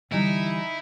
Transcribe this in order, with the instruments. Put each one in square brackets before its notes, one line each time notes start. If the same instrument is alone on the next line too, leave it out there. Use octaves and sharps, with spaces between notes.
[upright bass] D3 [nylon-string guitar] E3 G3 [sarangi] D#4 [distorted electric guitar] E4